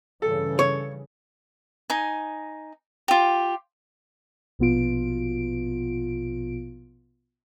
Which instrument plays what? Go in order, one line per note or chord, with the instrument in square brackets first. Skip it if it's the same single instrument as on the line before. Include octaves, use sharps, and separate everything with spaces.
[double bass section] G2 C#3 E3 [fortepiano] A4
[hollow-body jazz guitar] C#5
[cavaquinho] D#4 G#5
F4 G4
[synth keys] A#1 B2 B3 F4 D7